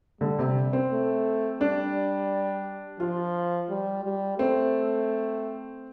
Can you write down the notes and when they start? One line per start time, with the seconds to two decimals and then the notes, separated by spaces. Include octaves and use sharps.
0.21 D3 G3
0.39 C3
0.73 C4
0.91 A3
1.61 G3 D4
3.00 F3 F4
3.69 G3
4.04 G3
4.39 A3 C4